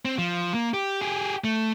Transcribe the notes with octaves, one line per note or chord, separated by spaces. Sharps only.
C4
F3
A#3
G4
G4 G#4
A3